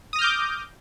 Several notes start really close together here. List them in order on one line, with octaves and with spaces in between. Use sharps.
D#6 A#6 F6 G6 D6